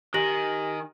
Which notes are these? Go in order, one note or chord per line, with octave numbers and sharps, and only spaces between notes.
D#3 G4 G#5 A#6 F#7